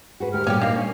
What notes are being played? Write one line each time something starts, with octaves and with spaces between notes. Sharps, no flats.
F#4 G#4 B4
D2 G4 A#4 F6
A#2 G3 C#4 F4 G4
D#3 A#3 D4 F5
C#4